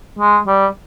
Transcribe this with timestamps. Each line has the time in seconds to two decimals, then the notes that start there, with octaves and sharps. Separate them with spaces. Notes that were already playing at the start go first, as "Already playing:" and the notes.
0.19 G#3
0.47 G3